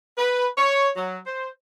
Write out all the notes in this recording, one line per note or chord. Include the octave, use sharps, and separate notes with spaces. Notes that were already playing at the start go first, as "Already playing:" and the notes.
B4
C#5
F#3
C5